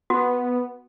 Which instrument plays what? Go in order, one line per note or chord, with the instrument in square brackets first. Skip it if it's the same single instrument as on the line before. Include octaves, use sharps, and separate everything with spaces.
[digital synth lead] B3 [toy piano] F#4